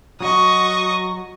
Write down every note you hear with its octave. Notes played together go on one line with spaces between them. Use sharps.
F#3 F#4 D#5 C#6